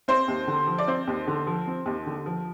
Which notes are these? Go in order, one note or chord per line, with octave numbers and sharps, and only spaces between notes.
C4 C5
D#2
D3
F3
D5
C4 C5
D#2
D3
F3
C4
D#2
D3
F3